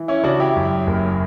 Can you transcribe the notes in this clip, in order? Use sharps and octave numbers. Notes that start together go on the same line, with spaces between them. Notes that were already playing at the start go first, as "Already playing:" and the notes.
Already playing: E3
C#4 E4
C#3 D4 F#4
E4 G4
F#2
F#1